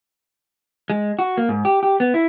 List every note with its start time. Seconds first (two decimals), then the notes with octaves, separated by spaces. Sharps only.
0.90 G#3
1.19 F#4
1.37 A#3
1.49 G#2
1.65 G4
1.83 G4
2.00 B3
2.14 E4